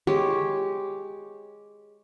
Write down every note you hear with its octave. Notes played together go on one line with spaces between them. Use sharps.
G#3 G4 C#5